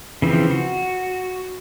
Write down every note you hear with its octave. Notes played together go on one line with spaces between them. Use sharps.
C#3 E3 F3 C4
F#4